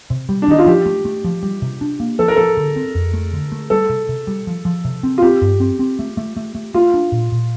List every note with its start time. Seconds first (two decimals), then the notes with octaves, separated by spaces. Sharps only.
0.10 C3
0.29 G3
0.42 D4
0.48 D#3 D#4
0.58 F4
0.67 F3 G4
0.86 A3
1.05 A3
1.24 F3
1.43 G3
1.62 C3
1.81 D4
2.00 A#3
2.19 F3 A4
2.28 A#4
2.36 F3 A4
2.57 D3
2.76 C4
2.95 F2
3.13 A3
3.33 D3
3.52 A3
3.70 G3 A4
3.89 C3
4.09 C3
4.27 G3
4.47 F3
4.65 F3
4.85 C3
5.03 C4
5.18 F4
5.22 C4 G4
5.41 G2
5.60 C4
5.79 C4
5.99 A3
6.17 A3
6.37 A3
6.55 A3
6.74 A3 F4
6.94 D4
7.12 A#2
7.32 A#2